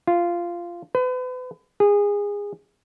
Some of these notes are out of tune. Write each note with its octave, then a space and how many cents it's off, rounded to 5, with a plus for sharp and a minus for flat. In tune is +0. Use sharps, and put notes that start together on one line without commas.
F4 -10
B4 +40
G#4 -25